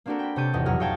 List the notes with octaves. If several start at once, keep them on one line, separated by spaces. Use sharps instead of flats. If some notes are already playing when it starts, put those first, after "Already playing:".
A#3 C4 D4 F#4 A4 A#4
G5 B5
C3 C4 C#5 A5 G6 D#7
G#1 E2 E3 D#5
B1 F2 F#3 G#4 A#4 F6
C#5 D#5 F5 G5 A5 G#6